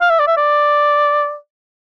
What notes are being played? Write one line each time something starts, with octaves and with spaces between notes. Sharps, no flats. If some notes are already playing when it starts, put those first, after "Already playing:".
F5
E5
D5
E5
D5